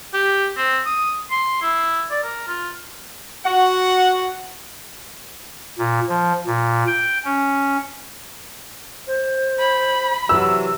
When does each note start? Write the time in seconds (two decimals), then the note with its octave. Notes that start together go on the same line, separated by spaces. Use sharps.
0.14 G4
0.57 C4
0.86 D#6
1.31 C6
1.62 E4
2.11 D5
2.23 A#4
2.48 F4
3.46 F#4 F#5
5.78 A#2
6.09 F3
6.46 A#2
6.87 G5
7.25 C#4
9.07 C5
9.59 B5
10.29 C3 E3 F#3 E6